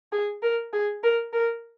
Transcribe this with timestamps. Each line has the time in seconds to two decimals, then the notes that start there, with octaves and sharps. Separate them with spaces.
0.12 G#4
0.43 A#4
0.73 G#4
1.03 A#4
1.33 A#4